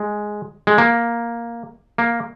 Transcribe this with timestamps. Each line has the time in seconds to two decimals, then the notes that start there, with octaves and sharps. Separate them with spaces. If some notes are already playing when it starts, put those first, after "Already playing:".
Already playing: G#3
0.67 G#3
0.78 A#3
1.98 A#3